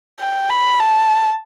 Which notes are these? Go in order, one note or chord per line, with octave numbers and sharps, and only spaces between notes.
G5
B5
A5